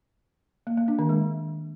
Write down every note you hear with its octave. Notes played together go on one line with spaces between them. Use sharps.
A#3
A#3
D4
D#3
G#3